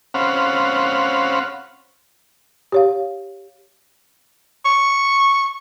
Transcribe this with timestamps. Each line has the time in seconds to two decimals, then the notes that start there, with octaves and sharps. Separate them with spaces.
0.14 C4 C#4 F5 F#5 B5
2.72 G4 C#5 F5
4.66 C#6